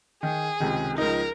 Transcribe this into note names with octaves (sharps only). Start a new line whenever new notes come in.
D#3 G#4
C#2 C3 D#3
C#2 F3 D#4 A#4